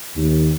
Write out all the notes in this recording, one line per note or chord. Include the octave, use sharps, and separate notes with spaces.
D#2